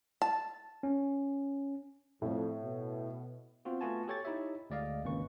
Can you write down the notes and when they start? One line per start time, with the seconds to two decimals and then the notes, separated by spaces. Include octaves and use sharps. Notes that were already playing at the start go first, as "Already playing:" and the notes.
0.22 A5
0.83 C#4
2.22 F2 A2
2.62 B2
3.65 B3 C4 F4 F#4
3.81 A3 B3 F4 F#4 G#5 A5
4.08 G4 A4 C#5 G5 C#6 A6
4.25 D#4 E4 G4 C#5 E5
4.70 D2 G#3 D5 D#5 F5
5.04 G#1 C#2 A#3 C#4 B4 C#6